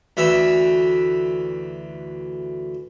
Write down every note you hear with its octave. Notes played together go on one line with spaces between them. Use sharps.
D2 E3 E5